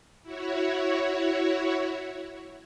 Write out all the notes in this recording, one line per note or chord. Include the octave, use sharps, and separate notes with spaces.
E4 F#4 C#5